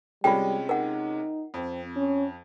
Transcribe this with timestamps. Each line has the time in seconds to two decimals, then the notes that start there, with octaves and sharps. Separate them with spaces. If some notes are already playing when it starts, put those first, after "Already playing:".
0.24 C3 G3 G#3 C#4 F4 G5
0.69 D#4 A#4 F#5
1.54 F2 C4
1.96 C#4